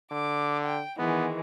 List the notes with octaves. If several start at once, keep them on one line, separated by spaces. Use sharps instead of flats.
D3 D6
G5
D#3 E3 G#3 B3